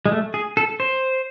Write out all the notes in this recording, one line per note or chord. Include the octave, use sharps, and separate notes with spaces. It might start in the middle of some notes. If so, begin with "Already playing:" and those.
G#3
A3
G#4
A4
C5